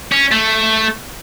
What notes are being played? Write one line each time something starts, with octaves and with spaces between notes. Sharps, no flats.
C#4
A3